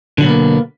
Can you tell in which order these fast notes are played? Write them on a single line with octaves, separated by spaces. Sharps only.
D3 F#3 B2 B3 A#3